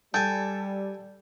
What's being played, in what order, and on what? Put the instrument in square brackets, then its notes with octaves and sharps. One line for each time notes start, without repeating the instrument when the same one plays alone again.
[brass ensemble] G3 [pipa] A4 [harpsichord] G5 G#5